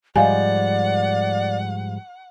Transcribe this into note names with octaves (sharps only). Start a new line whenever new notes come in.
G#2 F3 G3 D5 D#5 F5 F#5 G#5